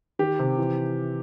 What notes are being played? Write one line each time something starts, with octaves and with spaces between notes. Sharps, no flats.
D#3 G4
C3
E3